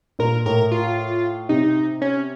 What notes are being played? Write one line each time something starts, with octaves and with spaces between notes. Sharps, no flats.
A#2 A#4
A2 A#4
F4
C3 D#4
C#4